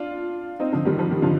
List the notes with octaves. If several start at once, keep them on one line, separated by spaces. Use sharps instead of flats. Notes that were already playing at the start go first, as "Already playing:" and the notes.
Already playing: D4 F4
C4 D#4
D3 F3
D#3 G3
F3
D#3
D3 F3